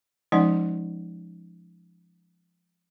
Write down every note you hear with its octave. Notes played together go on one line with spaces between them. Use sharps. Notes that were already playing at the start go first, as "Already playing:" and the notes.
F3 G#3 C#4 D#4 D5 F#5